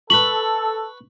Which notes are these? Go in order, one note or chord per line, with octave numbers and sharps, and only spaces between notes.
A4 B4 B5 C#6 F#7